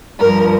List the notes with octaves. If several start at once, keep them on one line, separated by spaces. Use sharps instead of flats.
G2 F3 A#4